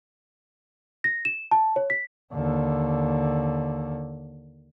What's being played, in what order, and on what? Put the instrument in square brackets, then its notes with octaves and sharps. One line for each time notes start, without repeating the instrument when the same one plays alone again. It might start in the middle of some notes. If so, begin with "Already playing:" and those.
[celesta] A#6
E7
A5
C#5
B6
[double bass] D#2 D3